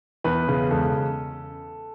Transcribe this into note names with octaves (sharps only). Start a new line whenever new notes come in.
E2 B4
C#3
E1 A4